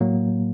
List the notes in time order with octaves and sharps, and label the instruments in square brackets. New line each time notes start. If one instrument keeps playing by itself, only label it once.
[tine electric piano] A2 F#3 A#3